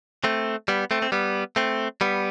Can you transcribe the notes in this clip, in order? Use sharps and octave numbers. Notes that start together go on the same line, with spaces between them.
A3 C4
G3 B3
A3 C4
C4
G3 B3
A3 C4
G3 B3